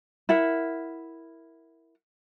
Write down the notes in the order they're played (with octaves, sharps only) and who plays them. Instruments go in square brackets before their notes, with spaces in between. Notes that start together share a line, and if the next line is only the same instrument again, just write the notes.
[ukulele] E4 A#4 F#5